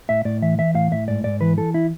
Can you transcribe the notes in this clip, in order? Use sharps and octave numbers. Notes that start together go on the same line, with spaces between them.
A2 E5
A2 D5
E3 E5
E3 E5
A2 F5
A2 E5
G#2 D5
G#2 D5
E3 B4
E3 A4
E4